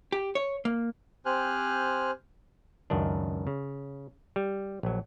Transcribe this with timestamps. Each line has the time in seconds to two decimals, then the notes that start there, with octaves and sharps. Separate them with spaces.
0.12 G4
0.35 C#5
0.65 A#3
1.26 C4 G4 C5 G#5 F6 F#6
2.90 C#2 F#2 D#3 D4
3.47 C#3
4.36 G3
4.83 A#1 F#3